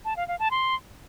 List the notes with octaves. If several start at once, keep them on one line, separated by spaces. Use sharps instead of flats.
A5
F5
F5
A5
C6